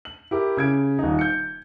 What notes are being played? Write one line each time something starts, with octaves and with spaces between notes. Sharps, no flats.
F#7
E4 G4 A#4
C#3 G#6 D7
D#1 D#4
G6 C#7